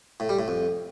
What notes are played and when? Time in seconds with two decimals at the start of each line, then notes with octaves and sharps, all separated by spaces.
0.20 A2
0.29 G3
0.39 A2
0.48 F2